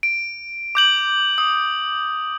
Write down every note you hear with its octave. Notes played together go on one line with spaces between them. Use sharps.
D7
D6 G6 F#7
D#6